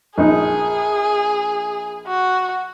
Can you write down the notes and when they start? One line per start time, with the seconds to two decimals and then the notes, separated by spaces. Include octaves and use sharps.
0.18 A#1 D#4 G#4
2.07 F#4